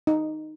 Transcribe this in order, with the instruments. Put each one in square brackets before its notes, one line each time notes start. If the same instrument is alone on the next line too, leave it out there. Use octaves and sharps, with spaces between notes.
[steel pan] D#4